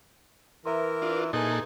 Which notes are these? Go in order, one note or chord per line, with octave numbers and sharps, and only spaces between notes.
E3 A#4 B4 E5 C6
D4 F4
A#2 D#4 G#4 A4 G#5 F#6